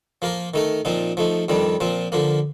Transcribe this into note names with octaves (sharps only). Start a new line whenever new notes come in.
F3 A#3 F4 A#4
D#3 A3 D#4 A#4
A#2 F3 C4 D#4
F3 A3 D#4
F2 D#3 G3 D4
A#2 F3 C4
D3 F3 A#3